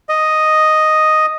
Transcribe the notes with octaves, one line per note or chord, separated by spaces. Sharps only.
D#5